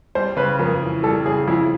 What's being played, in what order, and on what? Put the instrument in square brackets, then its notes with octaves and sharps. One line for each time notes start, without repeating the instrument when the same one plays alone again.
[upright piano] G3 [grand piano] C5
[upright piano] C#3 [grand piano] B4
[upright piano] F2 [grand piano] A#4
[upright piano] E3
[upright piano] G3 [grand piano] A4
[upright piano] C#3 [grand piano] G#4
[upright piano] F2 [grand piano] E4